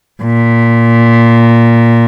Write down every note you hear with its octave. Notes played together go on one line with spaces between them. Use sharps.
A#2